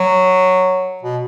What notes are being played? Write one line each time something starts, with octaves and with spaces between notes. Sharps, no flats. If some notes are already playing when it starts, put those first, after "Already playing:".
Already playing: F#3
B2